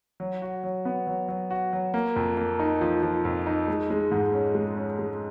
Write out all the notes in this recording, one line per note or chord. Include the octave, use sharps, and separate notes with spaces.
F#3
F#4
F#3
B3
F#3
F#3
F#4
F#3
A#3
F2
A#3
D#4
F3
F3
F2
D#4
G#3
G#3
G#2
C#4
G#3
C#4
G#3